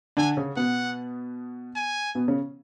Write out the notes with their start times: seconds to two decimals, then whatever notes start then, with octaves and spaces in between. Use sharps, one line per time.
0.17 D3 D4 G#5
0.37 C#3 C#4
0.56 B2 B3 F#5
1.76 G#5
2.15 B2 B3
2.28 C#3 C#4